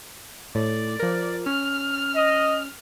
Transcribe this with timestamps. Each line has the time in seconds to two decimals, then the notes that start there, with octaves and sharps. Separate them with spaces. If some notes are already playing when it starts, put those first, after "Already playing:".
0.55 A2 D5
1.00 F3 A#4
1.46 C#4 F6
2.15 D#5